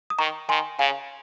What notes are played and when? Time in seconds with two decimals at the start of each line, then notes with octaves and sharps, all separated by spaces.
0.10 D#6
0.19 D#3 A#5 C#6
0.49 D#3 G#5 C6
0.79 C#3 F5 G#5